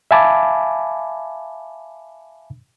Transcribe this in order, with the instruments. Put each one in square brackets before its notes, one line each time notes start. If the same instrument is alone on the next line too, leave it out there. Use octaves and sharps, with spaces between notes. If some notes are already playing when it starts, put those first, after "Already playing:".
[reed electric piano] E5 F5 G#5 A5 B5 D6